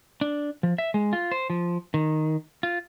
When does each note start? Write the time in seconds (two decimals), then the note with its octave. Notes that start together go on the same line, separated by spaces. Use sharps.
0.21 D4
0.63 F3
0.78 E5
0.94 G#3
1.13 F4
1.31 C5
1.50 F3
1.94 D#3
2.63 F4